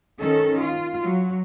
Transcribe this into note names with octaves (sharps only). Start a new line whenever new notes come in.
D#3 C#4 A4
F4
F#3